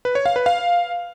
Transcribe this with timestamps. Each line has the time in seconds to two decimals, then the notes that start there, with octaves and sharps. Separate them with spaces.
0.05 B4
0.15 C#5
0.26 F5
0.36 B4
0.46 F5